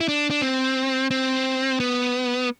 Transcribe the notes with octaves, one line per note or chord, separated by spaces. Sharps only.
E4
D4
D4
C4
C4
B3